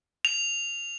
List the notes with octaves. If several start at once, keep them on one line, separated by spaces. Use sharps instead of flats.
F7